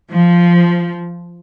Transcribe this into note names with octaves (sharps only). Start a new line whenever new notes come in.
F3